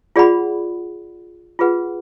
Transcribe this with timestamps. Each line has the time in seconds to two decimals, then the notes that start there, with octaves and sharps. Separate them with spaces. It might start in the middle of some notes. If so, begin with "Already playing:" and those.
0.16 F4 G#4 D5 F#5 B5
1.59 F4 G#4 B4 F#5